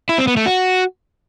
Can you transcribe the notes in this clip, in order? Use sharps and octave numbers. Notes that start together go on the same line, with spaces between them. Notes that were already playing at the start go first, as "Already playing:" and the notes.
E4
C4
B3
A3
F#4